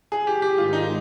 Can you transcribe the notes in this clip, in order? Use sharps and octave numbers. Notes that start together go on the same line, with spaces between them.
G#4
G4
G4
G#2 D#3 G#3 F4
D#4